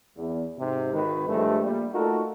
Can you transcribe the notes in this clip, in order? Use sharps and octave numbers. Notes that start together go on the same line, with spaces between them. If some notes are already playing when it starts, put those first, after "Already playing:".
E2
G#2 C3
G#1 D#3 B4
G2 F3 G#3 A3
A#2 G3
A3 D#4 F4 F#4 A4 A#4